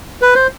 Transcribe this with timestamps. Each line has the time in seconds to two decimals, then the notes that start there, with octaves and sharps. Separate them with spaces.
0.22 B4
0.35 C5